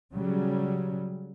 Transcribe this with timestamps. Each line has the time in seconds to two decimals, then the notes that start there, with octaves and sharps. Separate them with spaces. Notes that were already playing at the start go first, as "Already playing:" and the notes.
0.13 C#3 F#3 G3